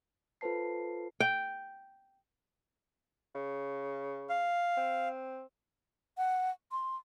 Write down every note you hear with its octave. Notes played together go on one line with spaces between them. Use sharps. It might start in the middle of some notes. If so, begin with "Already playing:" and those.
F4 A4 B4 C5 A5 C7
G5
C#3
F5
C4
F#5
C6